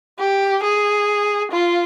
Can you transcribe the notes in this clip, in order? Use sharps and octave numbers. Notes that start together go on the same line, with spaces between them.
G4
G#4
F4